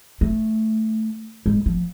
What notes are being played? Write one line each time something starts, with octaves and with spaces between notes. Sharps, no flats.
A3
G#3
F3